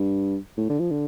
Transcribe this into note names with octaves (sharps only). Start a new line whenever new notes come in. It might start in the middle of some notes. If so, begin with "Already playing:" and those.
Already playing: G2
A2
D3
F3
D3